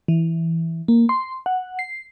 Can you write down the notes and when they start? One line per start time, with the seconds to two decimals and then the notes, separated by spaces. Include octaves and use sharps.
0.08 E3
0.88 A#3
1.09 C6
1.46 F#5
1.79 C7